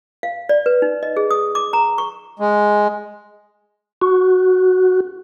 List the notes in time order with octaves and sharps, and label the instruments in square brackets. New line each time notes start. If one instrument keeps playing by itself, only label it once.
[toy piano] F5
D5
B4
D#4
D#5
G#4
D#6
D6
A#5
C#6
[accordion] G#3
[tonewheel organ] F#4